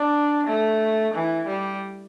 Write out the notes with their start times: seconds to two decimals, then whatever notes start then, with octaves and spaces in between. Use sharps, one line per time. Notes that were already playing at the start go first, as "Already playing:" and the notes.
Already playing: D4
0.47 A3
1.14 E3
1.47 G3